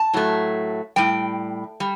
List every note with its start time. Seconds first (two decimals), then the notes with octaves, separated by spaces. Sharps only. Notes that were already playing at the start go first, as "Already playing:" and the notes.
Already playing: A5
0.13 A2 F#3 A3
0.96 A2 G3 G5
1.80 G3